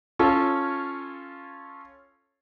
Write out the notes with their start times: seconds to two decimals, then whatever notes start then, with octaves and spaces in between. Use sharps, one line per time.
0.19 C#4 F4 A4 C#5